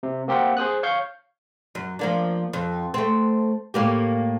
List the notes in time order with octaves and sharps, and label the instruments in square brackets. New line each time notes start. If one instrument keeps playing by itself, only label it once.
[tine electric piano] C3
A#3 C4 G4 A#4 C5 F#5
G#4 C5 D#6 F#6
C#5 F5 C#6 G6
[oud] F#2
F3 A#3 D4
F2
A3 C4
A2 A#3 G4